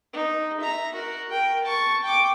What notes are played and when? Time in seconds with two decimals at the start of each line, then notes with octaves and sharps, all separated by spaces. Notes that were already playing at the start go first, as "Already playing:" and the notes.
0.13 D#4
0.60 E5 A#5
0.94 F#4 A#4
1.31 A#4 G5
1.64 A5 C#6
2.03 G5 D6